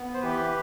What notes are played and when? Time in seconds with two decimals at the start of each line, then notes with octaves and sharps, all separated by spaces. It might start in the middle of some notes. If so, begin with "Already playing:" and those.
Already playing: B3
0.14 C5
0.22 E3 G4 B4